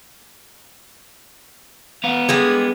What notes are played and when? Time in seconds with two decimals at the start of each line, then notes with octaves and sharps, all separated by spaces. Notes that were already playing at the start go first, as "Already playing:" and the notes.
2.04 B3 F5
2.29 G3 G#3 G#4